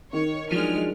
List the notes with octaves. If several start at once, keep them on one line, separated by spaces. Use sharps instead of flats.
D#3 C#5
F3 F#3 G#3 D4 F6